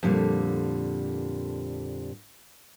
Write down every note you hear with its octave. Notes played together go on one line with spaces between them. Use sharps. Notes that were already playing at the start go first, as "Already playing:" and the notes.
F2 A#2 D3 G3